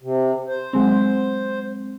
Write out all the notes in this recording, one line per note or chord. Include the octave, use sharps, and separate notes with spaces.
C3
C5
F#3 G#3 C4